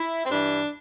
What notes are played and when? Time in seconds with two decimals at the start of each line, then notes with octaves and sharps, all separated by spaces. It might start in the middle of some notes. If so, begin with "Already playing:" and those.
Already playing: E4
0.24 C4
0.30 G2 E3 D4